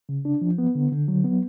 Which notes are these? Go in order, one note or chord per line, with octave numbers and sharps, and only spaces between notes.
C#3
D4
F3
B3
D3
D3
F#3
B3